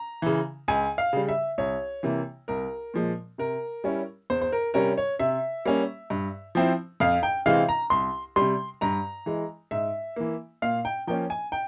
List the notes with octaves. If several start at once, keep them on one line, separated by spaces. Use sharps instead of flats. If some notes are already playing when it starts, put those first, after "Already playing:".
Already playing: A#5
C#3 E3
C#2 G#5
F5
C#3 G3
E5
C2 C#5
C3 E3 A#3
C2 A#4
A#2 F3 G#3
C3 A#4
G3 C#4 E4
E2 C5
C5
A#4
C3 G3 C#4 A#4
C#5
C3 E5
G3 A#3 C#4
G2
F3 C4 E4
F2 F5
G5
C3 E3 G#3 C4 F5
A#5
C2 C6
C3 G3 C6
G2 A#5
E3 G#3
G#2 E5
E3 A#3
A#2 F5
G5
F3 A#3 C#4 G5
G#5
G5